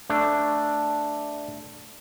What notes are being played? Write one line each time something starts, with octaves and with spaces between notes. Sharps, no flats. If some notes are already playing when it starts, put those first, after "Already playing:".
A3 D4